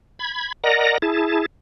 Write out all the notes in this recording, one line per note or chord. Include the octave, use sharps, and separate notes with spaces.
B5 G#6
A#4 D5 D#5 F#5 A#5 A#6
E4 G#4 A5